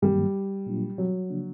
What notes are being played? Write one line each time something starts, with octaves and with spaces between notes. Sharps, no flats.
G2 D#3 F#3 G3 A#3
A#2 F#3 A#3 D4 F4
F#3
C#3 F3 A#3 D4